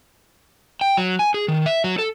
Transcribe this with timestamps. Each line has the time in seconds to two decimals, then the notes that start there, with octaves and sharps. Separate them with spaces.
0.81 G5
0.97 F#3
1.19 G#5
1.34 G#4
1.48 D#3
1.66 E5
1.84 F#3
1.98 A4